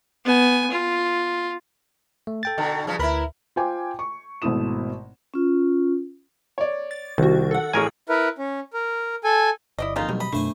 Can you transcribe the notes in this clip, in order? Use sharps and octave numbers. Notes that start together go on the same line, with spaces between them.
B3 G#5
F4
A3
A4 G5 A6
B2 D3
G2 C#3 F3
D2 E4 A#4 B4 B5
F4 C5 G5 G#5 D6
C#6
G#1 B2 A3 E4 D#6 E7
C#4 F4
C#5 D5
A6
C2 D#3 F#4
A4 F#5
A1 C#4 G#4 A#4 G#5
E4 A#4 B4
C#4
A#4
A4 G#5
G1 E4 D5 D#5
A#1 F2 C#3 D#4 F4
B2 D#3 F#3 G3
D#5 B5
F#2 B2 A3 D4 C5 G#5